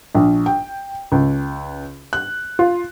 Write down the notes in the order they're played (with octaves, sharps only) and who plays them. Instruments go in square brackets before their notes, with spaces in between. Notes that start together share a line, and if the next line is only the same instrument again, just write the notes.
[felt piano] A#1
G5
C#2
F#6
F4